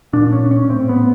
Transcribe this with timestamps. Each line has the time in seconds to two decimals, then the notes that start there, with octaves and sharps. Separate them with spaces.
0.13 A#2 D4
0.33 C#4
0.51 C#4
0.70 A2 C4
0.89 B3